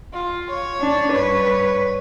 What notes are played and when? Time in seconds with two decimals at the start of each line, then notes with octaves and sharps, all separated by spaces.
0.13 F4
0.50 C#5
0.80 D4
1.13 G2 B4 C#5